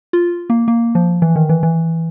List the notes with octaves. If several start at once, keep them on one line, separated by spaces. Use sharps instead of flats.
F4
A#3
A#3
F3
E3
D#3
E3
E3